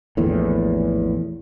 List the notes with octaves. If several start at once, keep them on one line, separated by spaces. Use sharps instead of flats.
A#1 E2 A2